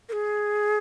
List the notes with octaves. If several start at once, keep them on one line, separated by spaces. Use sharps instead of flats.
A#4
G#4